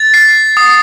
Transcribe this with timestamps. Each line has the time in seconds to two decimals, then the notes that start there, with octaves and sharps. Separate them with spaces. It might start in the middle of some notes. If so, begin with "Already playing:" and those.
Already playing: A6
0.14 C7
0.57 D#6